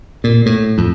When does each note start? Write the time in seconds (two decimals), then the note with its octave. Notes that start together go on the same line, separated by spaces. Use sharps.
0.24 A#2
0.46 A2
0.78 F2